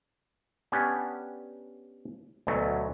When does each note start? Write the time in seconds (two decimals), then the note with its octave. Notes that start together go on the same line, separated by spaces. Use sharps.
0.72 B3 C#4 D4 G4
2.47 D2 B2 F#3 A3